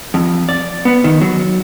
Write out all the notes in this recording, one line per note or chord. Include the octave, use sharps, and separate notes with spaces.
F2
D5
B3
D#3
F#3